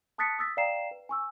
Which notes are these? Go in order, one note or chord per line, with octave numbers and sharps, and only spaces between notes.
A5 D#6 F#6 A6 B6 C#7
D#6 E6 A6 B6
D5 F5 G5 A#5 C7 E7
B4
G#5 C#6 E6